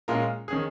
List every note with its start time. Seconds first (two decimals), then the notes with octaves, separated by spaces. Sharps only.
0.08 A#2 G#3 C#4 F4 A#4
0.48 D#3 C#4 G#4